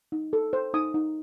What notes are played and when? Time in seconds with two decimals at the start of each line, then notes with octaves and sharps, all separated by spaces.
0.12 D#4
0.33 A4
0.53 C5
0.74 D#4 D#6
0.94 D#4